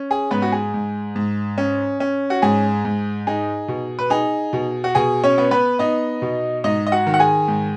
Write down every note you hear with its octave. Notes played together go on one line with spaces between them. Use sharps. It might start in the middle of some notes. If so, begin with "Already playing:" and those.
Already playing: C#4
G#4
G#2 B3 B4
F#4
G#4
G#2
G#2
C#4
C#4
F#4
G#2 G#4
G#2
D#4 G#4
B2
B4
D#4 G#4
B2
F#4
B2 G#4
C#4 C#5
B3
B3 B4
B3 D#4 D#5
B2
G#2 D#4 D#5
D#5
F#4 F#5
D#3
F#5
G#4 G#5
G#2